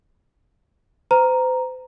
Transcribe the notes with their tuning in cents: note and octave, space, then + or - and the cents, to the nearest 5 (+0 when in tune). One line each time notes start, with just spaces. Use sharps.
C5 -40 A#5 +0